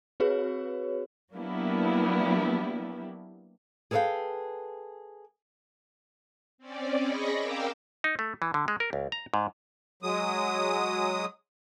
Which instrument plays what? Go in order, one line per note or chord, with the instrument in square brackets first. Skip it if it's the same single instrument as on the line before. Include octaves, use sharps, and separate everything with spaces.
[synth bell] C4 F#4 G#4 B4 C#5
[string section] F#3 A#3 B3 D4 E4 G4
[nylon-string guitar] G#4 A4 B4 C#5 F5 G5
[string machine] C4 C#4 D5
G#4 D#5 B5 C#6 A#6
A#4 F5 G5 D6 E6
[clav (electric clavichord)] D#4
A3
E3
D3
G#3
A#4
C#2
A#5
G#2
[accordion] F#3 G#3 D#6